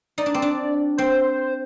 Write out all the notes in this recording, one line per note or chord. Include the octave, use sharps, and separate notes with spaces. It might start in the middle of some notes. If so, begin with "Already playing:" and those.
D#4 D5
D4
C4
D4
C4 C5